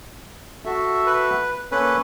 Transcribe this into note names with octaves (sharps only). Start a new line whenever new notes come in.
F#4 A4 E5
B4
A#3 C#4 A4 B4